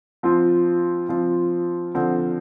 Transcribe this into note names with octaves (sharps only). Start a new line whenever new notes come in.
F3 C4 F4
F3 C4 F4
D3 F3 C4